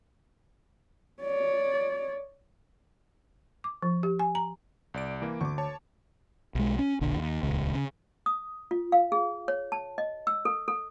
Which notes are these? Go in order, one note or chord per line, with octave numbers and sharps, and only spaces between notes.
C#5 D5
D6
F3
G4
G#5
A#5
C2 D5 D7
E3 A#3
D2 C#6 D6
C#5 A5
B1 G#3
C#4
E1 A#1 D3
D#2
D#1 C#2
C#3
D#6
F4
F5
G#4
C#5
A5
D#5
E6
A4
A4